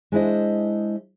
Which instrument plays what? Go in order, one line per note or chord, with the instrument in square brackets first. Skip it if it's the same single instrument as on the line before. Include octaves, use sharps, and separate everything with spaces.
[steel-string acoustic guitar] G#3 D4 E4 C5 D#5